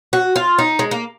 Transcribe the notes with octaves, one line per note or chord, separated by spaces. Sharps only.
F#4
F4
D#4
G#3
A#3